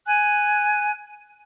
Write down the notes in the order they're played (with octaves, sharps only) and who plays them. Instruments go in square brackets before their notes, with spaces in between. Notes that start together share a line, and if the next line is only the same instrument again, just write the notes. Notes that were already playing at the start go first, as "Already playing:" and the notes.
[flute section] G#5 F#6